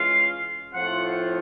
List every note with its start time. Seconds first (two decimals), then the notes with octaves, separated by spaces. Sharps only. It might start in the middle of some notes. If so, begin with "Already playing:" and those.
Already playing: E3 G#3 C#4 F4 F5
0.74 A2 F3 A3 C4 F4 F#5